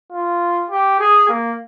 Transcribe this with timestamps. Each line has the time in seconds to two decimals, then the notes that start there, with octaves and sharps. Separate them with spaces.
0.12 F4
0.70 G4
0.99 G#4
1.29 A#3